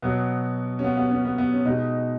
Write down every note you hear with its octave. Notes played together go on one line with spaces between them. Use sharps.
B2 F#3 B3
C#4
B3
B3
C#4
B3
B3
C#4
B2 G#3 D#4